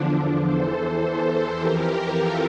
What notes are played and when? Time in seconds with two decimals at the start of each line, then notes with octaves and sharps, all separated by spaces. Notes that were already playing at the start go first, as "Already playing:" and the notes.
Already playing: E2 D3 F3 D4
0.42 E2 E3 A4 C5
1.55 F2 E3 G4 A#4
1.84 G4 A#4
2.12 F4 A4